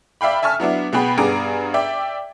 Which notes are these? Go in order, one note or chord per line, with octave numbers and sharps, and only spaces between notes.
D5 E5 F5 G5 B5
E5 G#5 A5 C#6 F6
F#3 B3 D4 E4
B2 B3 F#4 G#4 G5 B5
G2 B3 G#4 A#5 D6 D7
D5 E5 G5